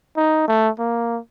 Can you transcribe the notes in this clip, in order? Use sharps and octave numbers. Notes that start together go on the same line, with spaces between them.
D#4
A3
A#3